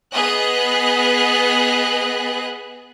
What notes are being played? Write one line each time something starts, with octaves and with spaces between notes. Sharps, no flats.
B3 G#4 D#5 F#6